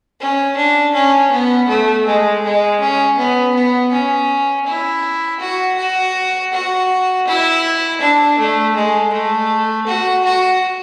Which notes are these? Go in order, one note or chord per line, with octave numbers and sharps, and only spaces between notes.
C#4
D4
C#4
B3
A3
G#3
G#3
C#4
B3
B3
C#4
E4
F#4
F#4
F#4
E4
D4
A3
G#3
A3
F#4
F#4